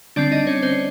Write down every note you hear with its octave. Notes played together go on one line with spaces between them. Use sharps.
D3 G3 C4 D4 D5
D#4 D#5
C#4 C#5
C4 C5